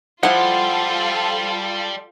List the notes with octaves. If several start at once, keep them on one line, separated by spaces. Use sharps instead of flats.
F3 G3 E4 F4 G4 A4 F#5